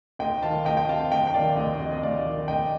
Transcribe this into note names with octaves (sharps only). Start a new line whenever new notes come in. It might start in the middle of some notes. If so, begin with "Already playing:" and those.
D2 D#5 G5
D#3 F5 A5
D2 D#5 G5
G5
C3 F5 A5
D2 D#5 G5
G5
D#3 D5 F5
D2 D#5
C3 D#5
D#5
D2 D5 F5
D#3
D2 D#5 G5